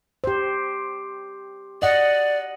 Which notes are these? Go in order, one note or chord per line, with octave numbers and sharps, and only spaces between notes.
G4 C5
D5 D#5 F#5